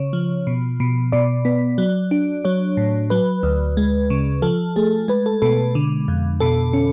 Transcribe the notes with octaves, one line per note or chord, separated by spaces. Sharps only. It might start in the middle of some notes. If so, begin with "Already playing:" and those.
Already playing: C#3 C#5
F3
B2
B2
B2 D5
B3
F#3
D4
F#3 C#5
A2
F#3 B4
D2
G#3
C#3
F3 A4
A3 G#4
G#3 B4
A4
B2 A4
D3
F2
B2 A4
C#4